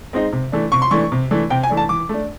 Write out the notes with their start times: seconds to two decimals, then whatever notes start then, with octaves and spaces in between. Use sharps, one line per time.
0.13 G#3 C4 D#4
0.32 C3
0.52 E3 A3 D4
0.72 C3 C#6
0.82 C6
0.91 E3 A3 D4 C#6
1.12 C3
1.31 E3 A3 D4
1.50 C3 G5
1.63 G#5
1.69 E3 A3 D4
1.77 A5
1.89 E3 D6
2.09 A3 D4